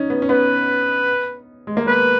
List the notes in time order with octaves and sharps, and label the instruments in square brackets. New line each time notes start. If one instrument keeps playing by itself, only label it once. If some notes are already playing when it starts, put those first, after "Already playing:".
Already playing: [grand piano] C#4 D#4
B3
C#4
[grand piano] B3 [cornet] B4
[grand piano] G#3
A#3
[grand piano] B3 [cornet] B4